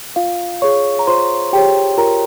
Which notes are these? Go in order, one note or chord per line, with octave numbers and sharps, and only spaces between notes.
F4 F5
G#4 C#5 C#6
A#5
F4 C5 C6
G4 G#4 C#5 G5
F4 A#4 A#5